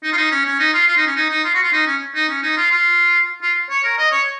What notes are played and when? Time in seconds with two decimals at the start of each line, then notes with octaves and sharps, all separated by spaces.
0.03 D#4
0.13 F4
0.17 D#4
0.31 C#4
0.45 C#4
0.59 D#4
0.73 F4
0.87 F4
0.97 D#4
1.07 C#4
1.16 D#4
1.30 D#4
1.44 F4
1.54 F#4
1.63 F4
1.72 D#4
1.86 C#4
2.15 D#4
2.29 C#4
2.43 D#4
2.57 F4
2.71 F4
3.42 F4
3.70 C#5
3.84 A#4
3.98 D#5
4.12 C#5